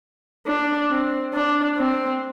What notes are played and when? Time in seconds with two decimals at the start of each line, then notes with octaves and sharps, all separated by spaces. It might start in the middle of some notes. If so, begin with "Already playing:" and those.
0.46 D4
0.89 C4
1.34 D4
1.78 C4